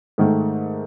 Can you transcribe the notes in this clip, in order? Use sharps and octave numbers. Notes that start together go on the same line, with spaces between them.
G#2 D#3 A3